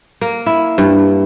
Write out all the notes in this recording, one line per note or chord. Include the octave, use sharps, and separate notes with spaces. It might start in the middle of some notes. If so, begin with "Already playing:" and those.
A#3
E4
G2